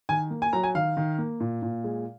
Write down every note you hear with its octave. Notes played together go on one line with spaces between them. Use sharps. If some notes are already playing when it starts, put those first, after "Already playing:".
D#3 G#5
A#3
G#5
F#3 A#5
G#5
D#3 F5
D#3
A#3
A#2
A#2
G#3